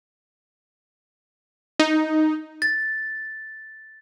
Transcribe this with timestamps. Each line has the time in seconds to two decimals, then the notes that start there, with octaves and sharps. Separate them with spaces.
1.79 D#4
2.62 A6